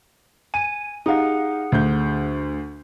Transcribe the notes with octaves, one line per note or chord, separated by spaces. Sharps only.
G#5 D#7
D#4 G4 G#4 F5 F#5
D2 D3 G6